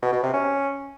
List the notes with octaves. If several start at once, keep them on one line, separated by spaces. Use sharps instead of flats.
B2
B2
C3
C#4